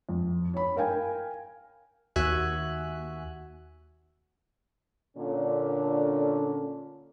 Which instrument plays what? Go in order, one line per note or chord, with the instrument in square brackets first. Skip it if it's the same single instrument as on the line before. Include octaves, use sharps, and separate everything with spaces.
[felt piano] F2
C#5 B5
A#4 F5 G5 G#5
[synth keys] D#2 F#4 E5 G#5 F#6
[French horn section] A#2 D3 C#4